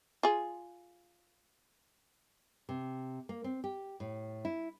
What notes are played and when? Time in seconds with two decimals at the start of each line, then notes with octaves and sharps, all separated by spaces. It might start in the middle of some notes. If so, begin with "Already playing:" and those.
0.23 F4 G#4
2.69 C3
3.29 A#3
3.44 C4
3.64 G4
4.00 A2
4.45 E4